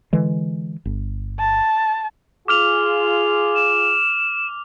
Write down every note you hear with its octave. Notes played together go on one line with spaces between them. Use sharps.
D3 E3 G#3
G1
A5
F4 G#4 D6 F6 F7
E7